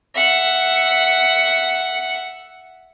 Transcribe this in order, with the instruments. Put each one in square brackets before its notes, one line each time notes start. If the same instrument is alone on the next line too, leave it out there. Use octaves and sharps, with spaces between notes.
[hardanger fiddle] E5 F#5